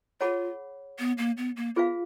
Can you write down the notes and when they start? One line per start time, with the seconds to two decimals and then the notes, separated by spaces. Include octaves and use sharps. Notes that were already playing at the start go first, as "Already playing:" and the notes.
0.21 F4 G#4 C#5 F#5 B5
0.99 B3
1.18 A#3
1.37 B3
1.57 A#3
1.76 B3 F4 G#4 B4 F5